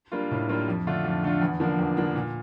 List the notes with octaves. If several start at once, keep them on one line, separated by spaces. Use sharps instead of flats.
G3 A#3 D4 F4
A2
G3 A#3 D4 F4
F2
D3 A3 D4 F4
F2
D3 A3 D4 F4
E2
D3 F3 A#3 D4
E2
D3 F3 A#3 D4
A#2